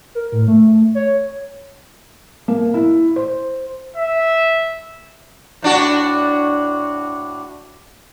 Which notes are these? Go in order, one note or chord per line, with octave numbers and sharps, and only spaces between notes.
A#4
A2
A3
C#5
A#3
E4
C5
E5
A2 D4 F#4